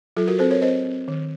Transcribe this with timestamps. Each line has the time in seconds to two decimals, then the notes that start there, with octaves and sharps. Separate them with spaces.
0.17 F#3 F4 A4
0.27 F#4 A#4
0.39 C4 A4 C5
0.51 A#4 C#5
0.62 C4 C5 D#5
0.84 C4
1.08 D#3